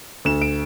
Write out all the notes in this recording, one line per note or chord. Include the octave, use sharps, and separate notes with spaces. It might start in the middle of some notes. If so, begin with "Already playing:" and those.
D2 E7
D7